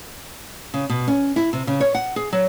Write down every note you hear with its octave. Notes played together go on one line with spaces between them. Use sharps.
C#3
B2
C#4
E4
C3
C#3
C#5
F#5
G#4
F#3